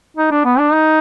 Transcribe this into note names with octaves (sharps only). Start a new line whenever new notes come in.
D#4
D4
B3
D4
D#4